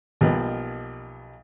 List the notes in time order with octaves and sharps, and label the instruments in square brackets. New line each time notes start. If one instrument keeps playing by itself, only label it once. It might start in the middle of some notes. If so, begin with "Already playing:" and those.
[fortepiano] B1 B2 F3 G3 A#3 B3